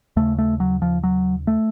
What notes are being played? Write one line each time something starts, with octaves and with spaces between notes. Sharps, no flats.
D#2 C#3 A3
A3
F#3
F3
F#3
A3